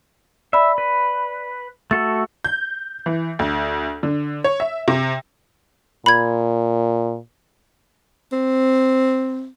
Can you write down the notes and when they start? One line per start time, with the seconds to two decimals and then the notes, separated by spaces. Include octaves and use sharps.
0.53 D5 E5 B5
0.78 B4
1.91 A3 F#4 A4 A6
2.45 G6
3.06 E3
3.39 D2
4.03 D3
4.44 C#5
4.60 E5
4.88 C3
6.06 A#2 B5 G#6
8.33 C4